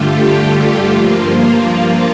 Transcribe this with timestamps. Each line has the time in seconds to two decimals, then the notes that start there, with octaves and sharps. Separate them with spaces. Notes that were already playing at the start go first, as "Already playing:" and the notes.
Already playing: G2 D3 A3 F4 G4
0.21 G4
0.56 F4
0.91 G2 F3 A#3 F4